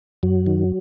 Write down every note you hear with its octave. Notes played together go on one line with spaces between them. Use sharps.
F#2 F#3
D#3